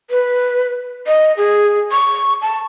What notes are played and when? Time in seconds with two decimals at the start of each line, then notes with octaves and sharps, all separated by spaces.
0.10 B4
1.07 D#5
1.37 G#4
1.92 C#6
2.42 A5